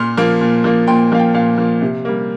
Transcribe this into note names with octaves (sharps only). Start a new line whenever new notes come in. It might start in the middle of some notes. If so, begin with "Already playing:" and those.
Already playing: A#2 C6 F6
F3 A#3
A#2
F3 A#3
A#2 G5 C6
F3 A#3 F5
G5
A#2 F5
F3 A#3
C3
G3 A#3